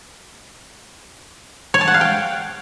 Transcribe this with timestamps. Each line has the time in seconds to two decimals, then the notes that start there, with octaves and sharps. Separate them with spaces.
1.74 C#5
1.81 A5
1.88 F#5
1.94 F5
2.01 G5